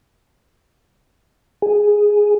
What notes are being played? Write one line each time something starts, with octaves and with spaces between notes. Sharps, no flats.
G#4